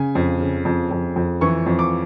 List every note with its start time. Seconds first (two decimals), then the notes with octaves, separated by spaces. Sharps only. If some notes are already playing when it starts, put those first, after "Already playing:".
Already playing: C#3 G#5
0.15 F2
0.41 C#3
0.65 F2
0.91 F2
1.16 F2
1.41 E3 C#6
1.66 F2
1.79 D6